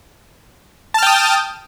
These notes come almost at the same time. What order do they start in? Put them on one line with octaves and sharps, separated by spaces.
A5 F6 G5 D#6